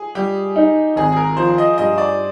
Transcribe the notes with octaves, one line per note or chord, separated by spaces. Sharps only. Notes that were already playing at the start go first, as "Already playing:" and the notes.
Already playing: G#4
G3 G4
D#4
G#1 G#4
G#4
A#4
F3 C5
D#5
G2 D#5
D5